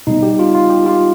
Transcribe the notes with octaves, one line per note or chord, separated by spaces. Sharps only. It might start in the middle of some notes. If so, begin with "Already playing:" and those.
B2 G3 B3 D#4
G4
F4
F4
G4
F4